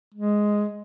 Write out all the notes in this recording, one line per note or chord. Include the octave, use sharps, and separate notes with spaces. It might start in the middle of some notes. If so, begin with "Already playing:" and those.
G#3